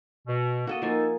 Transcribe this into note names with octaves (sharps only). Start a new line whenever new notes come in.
B2
A#3 F#4 A4 D#5
F3 A#3 D#4 A4 G#5